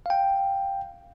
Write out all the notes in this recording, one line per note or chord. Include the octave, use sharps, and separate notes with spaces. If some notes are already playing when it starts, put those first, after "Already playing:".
F5 G5